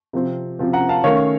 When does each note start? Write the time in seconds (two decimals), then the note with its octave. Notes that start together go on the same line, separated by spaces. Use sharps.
0.13 C3 F3 C4
0.59 C3 F3 C4
0.73 F#5 A#5
0.89 F5 A5
1.04 D#3 A3 C#4 C#5 F5